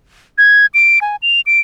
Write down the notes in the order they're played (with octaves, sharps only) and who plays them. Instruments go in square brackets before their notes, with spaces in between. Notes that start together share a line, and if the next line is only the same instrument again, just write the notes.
[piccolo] G#6
D7
G#5
F7
D7